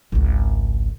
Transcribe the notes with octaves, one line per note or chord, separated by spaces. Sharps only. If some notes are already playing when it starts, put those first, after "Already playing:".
G#1 C#2